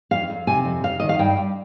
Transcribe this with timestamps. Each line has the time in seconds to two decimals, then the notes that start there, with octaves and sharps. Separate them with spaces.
0.11 F2 F5
0.30 F2
0.47 C3 G#5
0.65 F2
0.84 F2 F5
1.00 D#3 D#5
1.09 F5
1.19 G2 G5
1.37 G2